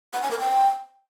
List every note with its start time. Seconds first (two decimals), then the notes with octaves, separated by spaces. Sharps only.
0.14 F#5
0.22 G#5
0.31 A#4
0.40 G5